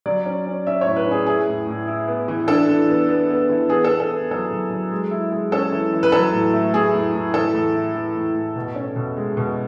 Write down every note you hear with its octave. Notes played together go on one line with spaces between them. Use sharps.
F#3 D5
C#4
C#4
C#4 E5
A2 C#5
B4
C#4
G#4
E4 G#4
A2
A2
E4
B3
E3
D4 A4
E3
B3
B3
B3
E3
B3 G#4
A4
B3
A4
B3
F#3 A4
F#3
F#3
G#3
E4
G#3
C#4 A4
E3
E3
B4
F#3 A4
A2
A3
A3 G#4
A2
A2
E3 A4
A2
E4
E3
A2
A2
B2
C#4
B2
G#3
B2